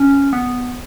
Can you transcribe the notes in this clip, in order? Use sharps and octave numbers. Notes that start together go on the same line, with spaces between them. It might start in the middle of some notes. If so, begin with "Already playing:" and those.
Already playing: C#4
B3